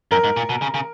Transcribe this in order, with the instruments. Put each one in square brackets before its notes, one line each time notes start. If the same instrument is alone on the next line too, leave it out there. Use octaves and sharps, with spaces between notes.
[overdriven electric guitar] F#2 [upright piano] A#4
[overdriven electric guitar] G#2
A#2
B2
C#3
C#3